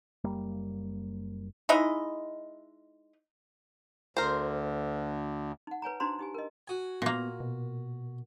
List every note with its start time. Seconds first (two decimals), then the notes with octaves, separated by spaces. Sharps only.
0.24 F#1 G3 A#3
1.69 G#3 D#4 E4 D#5
4.17 D2 A#4 C5
5.67 D#4 F#5
5.82 B4 C#5 G#5 A#5
6.00 D4 D#4 F#4 C5 A#5 C6
6.19 D#4 G4 G#5
6.34 A#4 D#5
6.67 F#4 G#5
7.02 A#2 A#3 B3
7.40 B2